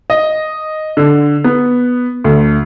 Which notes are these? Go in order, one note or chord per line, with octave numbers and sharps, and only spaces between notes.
D#5
D3
B3
D2